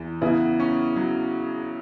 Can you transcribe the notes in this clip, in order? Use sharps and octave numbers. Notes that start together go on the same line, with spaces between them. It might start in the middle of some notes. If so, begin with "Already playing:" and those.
Already playing: E2 E3
C#3 B3 E4
C#4
F#3